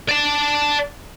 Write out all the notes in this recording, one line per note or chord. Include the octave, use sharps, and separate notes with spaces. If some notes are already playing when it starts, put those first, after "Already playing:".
D5 A5